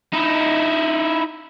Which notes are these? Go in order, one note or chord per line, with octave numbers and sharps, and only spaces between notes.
D#4 E4